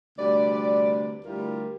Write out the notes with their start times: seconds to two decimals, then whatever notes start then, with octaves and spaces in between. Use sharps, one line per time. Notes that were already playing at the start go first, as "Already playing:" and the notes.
0.18 D2 C3 G3 B4 D5
1.25 D2 G3 E4 F4 G4 A#4